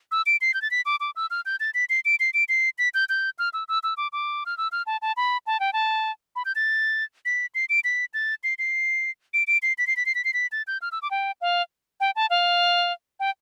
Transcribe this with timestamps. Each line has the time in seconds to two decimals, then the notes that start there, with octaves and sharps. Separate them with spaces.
0.12 E6
0.26 D7
0.41 C7
0.54 G6
0.62 A6
0.71 B6
0.86 D6
1.00 D6
1.16 E6
1.31 F6
1.46 G6
1.60 A6
1.74 B6
1.90 C7
2.05 D7
2.20 C7
2.34 D7
2.49 C7
2.78 B6
2.94 G6
3.09 G6
3.39 F6
3.53 E6
3.68 E6
3.83 E6
3.97 D6
4.13 D6
4.46 F6
4.58 E6
4.72 F6
4.87 A5
5.02 A5
5.17 B5
5.47 A5
5.60 G5
5.73 A5
6.36 B5
6.45 G6
6.56 A6
7.25 B6
7.55 C7
7.69 D7
7.84 B6
8.14 A6
8.44 C7
8.59 C7
9.34 D7
9.47 D7
9.63 C7
9.78 B6
9.87 C7
9.96 B6
10.06 C7
10.15 B6
10.25 C7
10.34 B6
10.52 A6
10.67 G6
10.82 F6
10.92 E6
11.02 D6
11.11 G5
11.41 F5
12.00 G5
12.16 A5
12.30 F5
13.20 G5